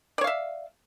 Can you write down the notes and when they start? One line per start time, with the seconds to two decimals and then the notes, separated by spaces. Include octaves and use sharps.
0.18 D5
0.21 C#5
0.24 F5
0.27 E5